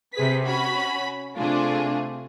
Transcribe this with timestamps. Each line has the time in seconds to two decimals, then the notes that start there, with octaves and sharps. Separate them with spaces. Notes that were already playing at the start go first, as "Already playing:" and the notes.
0.13 C3 G#4 B4 B6
0.44 C#4 F#4 B5
1.37 C3 A3 D4 F4 G#4